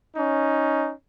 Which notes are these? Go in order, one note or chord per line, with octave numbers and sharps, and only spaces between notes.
C#4 D#4